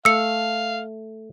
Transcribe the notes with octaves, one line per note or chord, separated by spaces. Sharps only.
A3 F5 E6 C#7